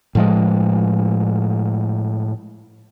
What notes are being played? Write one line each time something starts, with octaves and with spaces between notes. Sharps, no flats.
A2 F3 G#3